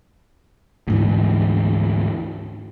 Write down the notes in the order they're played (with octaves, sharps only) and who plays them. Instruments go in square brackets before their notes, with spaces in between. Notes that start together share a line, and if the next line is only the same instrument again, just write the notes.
[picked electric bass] D2 G#2 E3